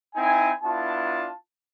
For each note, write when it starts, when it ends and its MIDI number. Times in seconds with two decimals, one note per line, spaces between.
0.14 0.51 60
0.14 0.51 63
0.14 0.51 64
0.14 0.51 80
0.62 1.29 59
0.62 1.29 62
0.62 1.29 64
0.62 1.29 65
0.62 1.29 81